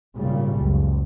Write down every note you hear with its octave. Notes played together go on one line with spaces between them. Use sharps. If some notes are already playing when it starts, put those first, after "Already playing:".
G#1 A#2 C#3 G3
F#1 C#2